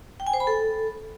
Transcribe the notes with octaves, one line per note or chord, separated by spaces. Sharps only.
G5
G#5
C5
B5
A4